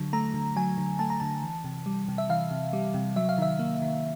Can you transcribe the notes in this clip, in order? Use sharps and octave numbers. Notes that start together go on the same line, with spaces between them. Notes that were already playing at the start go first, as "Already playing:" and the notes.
Already playing: D3 F#3
A3 A#5
D3
F#3 G#5
D3
A3 A5
A#5
D3 A5
E3
C3
G3
C3
E5
E3 F5
C3
G3
C3
F#3 E5
F5
D#3 E5
A#3
D#3